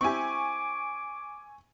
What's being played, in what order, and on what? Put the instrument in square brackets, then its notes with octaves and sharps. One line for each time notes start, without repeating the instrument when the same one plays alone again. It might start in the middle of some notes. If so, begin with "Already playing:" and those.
[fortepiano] C4 E4 G4 [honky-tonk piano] G#5 C#6 [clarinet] D6